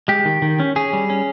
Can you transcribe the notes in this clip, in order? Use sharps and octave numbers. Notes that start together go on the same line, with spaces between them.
G#3 G4
D#3
D#3
C#4
C#4 G#4
G3
C#4